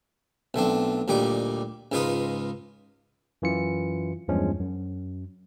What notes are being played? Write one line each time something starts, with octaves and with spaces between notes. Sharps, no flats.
B1 A3 C4 D4
D2 A#2 G3 D#4 D6
C#2 G#2 D#4 F4 B4 D#6
F#2 E3 F4 C#7
E2 G2 F3 G#3 C#4
F#2